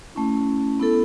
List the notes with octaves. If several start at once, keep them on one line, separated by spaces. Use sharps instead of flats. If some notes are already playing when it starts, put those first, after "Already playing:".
A3 C#4 E4
B3 E4 A4